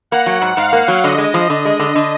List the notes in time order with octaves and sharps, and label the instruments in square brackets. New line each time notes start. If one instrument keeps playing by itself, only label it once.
[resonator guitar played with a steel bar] A#3 [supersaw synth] F#5
[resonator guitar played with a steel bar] F#3
G#2
[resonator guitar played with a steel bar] G#2 [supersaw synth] F5
[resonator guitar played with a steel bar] A#3
F#3
[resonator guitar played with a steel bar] D3 [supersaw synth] D#5
[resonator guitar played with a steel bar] G#3
F3
D3
G#3
D3
D3